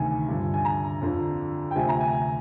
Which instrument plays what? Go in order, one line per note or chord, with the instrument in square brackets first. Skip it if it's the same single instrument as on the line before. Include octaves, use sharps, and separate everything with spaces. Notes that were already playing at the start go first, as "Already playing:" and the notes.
Already playing: [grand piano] D2 C3 D#3 G#5
G2 D3 F3
G#5
A#5
F2 D3 F3
G5
D2 C3 F3 G#5
A#5
G#5
G#5